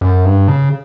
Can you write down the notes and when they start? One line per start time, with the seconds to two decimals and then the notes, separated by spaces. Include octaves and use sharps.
0.01 F#2
0.25 G2
0.48 C#3